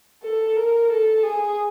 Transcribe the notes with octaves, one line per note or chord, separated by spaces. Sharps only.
A4
A#4
A4
G#4